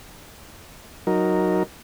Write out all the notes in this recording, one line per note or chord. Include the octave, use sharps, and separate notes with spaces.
F#3 D#4 A#4